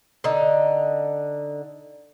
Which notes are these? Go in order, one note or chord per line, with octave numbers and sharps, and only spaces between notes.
D3 D#4